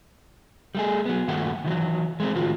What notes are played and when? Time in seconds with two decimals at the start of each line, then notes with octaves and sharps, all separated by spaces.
0.75 G3 A3 G#4
1.06 F#3 B3
1.28 G2 D#3 A3 A#3 F#5
1.64 D#3 E3 F#3
2.20 G#3 A3 C4
2.35 A2 D#3 F4 F#4